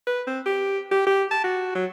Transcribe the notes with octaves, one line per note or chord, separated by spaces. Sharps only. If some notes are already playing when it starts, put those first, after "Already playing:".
B4
C4
G4
G4
G4
A5
F#4
F#3